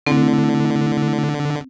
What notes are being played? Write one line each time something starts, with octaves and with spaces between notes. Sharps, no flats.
D3 A3 C4 E4